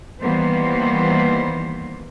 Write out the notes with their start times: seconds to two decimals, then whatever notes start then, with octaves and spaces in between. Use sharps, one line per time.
0.21 D#3 E3 G3 A#3 B3 C5